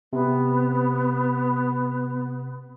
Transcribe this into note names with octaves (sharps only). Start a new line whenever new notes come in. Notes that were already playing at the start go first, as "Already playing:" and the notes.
C3 B3